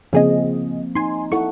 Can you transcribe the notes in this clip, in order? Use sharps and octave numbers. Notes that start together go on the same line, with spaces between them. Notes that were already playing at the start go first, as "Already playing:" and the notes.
C#3 F3 A#3 C4 G#4 D#5
D#4 G#5 C6
E4 A4 F#5 C#6